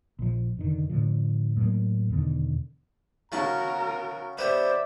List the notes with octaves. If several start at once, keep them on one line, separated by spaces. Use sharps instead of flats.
A#1 F3
F1 D3 D#3
A2 D3 F3
A2 F#3 G3 A#3
E2 B2 D3 D#3
C#3 F#4 A#4 A5 A#5 C#6
B3 G4 B4 C5 D5 E5